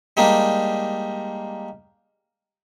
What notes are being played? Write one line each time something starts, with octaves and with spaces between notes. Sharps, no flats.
G3 G#3 A#3 D4 D#4 G4